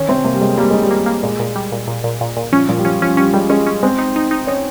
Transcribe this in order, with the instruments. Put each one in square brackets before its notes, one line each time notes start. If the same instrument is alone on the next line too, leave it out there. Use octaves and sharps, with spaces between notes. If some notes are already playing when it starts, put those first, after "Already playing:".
Already playing: [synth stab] D#3 [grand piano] C#4
[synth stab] C3 [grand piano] C4
[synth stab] C3 [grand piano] A#3
[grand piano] G3
[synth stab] C3 [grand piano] G#3
[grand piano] G3 [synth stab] A#3
[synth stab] D#3 [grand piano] G#3
[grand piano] G3
[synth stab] A#3
A#3
[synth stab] A#2 [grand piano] G#3
[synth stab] A#2
G3
A#2
A#2
A#2
A#2
A#2
[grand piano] F3 [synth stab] C#4
[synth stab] A#2 [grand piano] F3
[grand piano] G3
[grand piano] F3 [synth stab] C#4
[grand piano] F3 [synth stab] C#4
[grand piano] G3 [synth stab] C#4
[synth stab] G3 [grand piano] G#3
[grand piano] G#3 [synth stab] C#4
[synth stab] C#4
[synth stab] G#3 [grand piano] C4
[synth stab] D#4
D#4
D#4
[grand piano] C#4 [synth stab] D#4